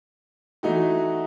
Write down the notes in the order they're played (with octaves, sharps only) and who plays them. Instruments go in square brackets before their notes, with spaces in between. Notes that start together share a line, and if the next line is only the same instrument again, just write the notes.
[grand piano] E3 A3 D#4 F#4